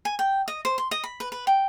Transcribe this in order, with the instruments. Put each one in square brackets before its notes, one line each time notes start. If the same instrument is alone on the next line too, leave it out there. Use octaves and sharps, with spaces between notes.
[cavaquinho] G#5
G5
D#5
C5
C6
D#5
B5
B4
B4
G5